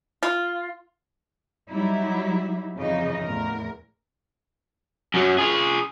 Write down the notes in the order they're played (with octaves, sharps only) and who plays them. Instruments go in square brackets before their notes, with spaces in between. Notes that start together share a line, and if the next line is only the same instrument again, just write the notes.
[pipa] F4
[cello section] F#3 G3 D#4 E4
F2 C#3 E3 D#4 D#5
E2 A2 A#4
[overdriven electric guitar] F#2 F#3
F4 G#4